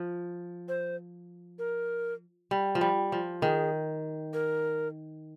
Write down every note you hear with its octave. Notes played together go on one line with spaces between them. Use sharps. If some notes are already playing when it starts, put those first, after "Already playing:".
Already playing: F3
C5
A#4
G3
F3
G3
F3
D#3 G#4
A#4